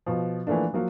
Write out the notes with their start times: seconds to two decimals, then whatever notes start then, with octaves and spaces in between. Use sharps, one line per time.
0.06 B2 F3
0.47 E3 F3 A3 A#3 D4
0.73 F3 F#3 A#3